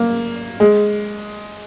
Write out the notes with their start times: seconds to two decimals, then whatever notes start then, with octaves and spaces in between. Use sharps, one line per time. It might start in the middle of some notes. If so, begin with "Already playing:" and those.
Already playing: A#3
0.60 G#3